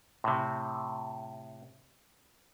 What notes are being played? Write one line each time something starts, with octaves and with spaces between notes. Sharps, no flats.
A2 C3